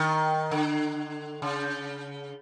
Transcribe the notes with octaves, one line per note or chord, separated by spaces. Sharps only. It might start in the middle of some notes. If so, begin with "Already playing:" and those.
Already playing: D#3
D3
C#3